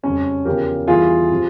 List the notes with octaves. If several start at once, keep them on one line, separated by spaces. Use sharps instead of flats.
F2 C#3 G3 C#4
E2 C#3 F3 G4 A#4
E2 E3 G3 F4 G#4
C3 F3